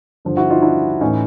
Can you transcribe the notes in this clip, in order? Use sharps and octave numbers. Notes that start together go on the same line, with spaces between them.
G2 D3 F3
E4 F#4
D#4 F4
D4 E4
A2 E3 C#4 D#4